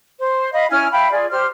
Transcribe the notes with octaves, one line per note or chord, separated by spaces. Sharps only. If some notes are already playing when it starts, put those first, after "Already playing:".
C5
D#5 F5 B5
C#4 E4 G#5 F6
E5 F5 G5 B5
F4 G#4 D5
G4 C5 F6